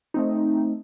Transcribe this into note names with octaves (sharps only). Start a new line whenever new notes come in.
A3 C4 D#4